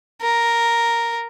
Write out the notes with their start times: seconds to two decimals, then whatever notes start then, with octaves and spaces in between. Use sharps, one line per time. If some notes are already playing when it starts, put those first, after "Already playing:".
0.22 A#4